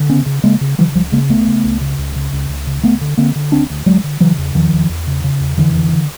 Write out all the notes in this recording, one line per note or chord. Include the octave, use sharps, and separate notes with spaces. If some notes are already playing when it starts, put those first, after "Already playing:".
Already playing: D3
C#3 B3 C#4
C#3
C#3 G#3 A#3
C#3
C#3 E3 F#3
C#2 F3 G3
C#3 G#3 A#3
C#2 A3 B3
C#3
C#2
C#3
C#2
C#3
C#2
C#2
C#3
D2 A3 B3
D3
D3 A#3 C4
D3
D2 C4 D4
D2
D2 F#3 G#3
D3
C#3 E3 F#3
E2
E2 D#3 F3
E2
E2
C#3
C#3
E2
F2 D3 E3
D3
D3